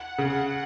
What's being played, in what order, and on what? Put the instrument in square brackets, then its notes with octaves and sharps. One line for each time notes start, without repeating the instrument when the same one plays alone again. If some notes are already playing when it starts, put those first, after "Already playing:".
Already playing: [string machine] F#5
[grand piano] C#3